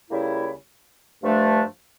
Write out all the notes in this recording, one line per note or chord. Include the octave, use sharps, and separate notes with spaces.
C#2 C#3 G3 A#3 E4
G2 F3 A3 D4